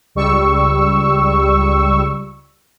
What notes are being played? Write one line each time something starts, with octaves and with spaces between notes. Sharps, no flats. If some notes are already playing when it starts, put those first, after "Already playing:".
C#2 G3 C#6 E6